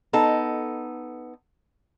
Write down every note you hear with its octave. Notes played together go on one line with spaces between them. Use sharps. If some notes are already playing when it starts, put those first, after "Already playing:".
B3 D#4 A4